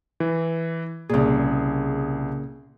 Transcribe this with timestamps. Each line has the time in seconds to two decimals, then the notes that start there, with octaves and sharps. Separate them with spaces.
0.20 E3
1.09 C2 A#2 C#3 G#4